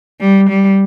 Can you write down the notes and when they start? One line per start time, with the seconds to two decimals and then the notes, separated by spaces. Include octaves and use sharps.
0.20 G3
0.49 G3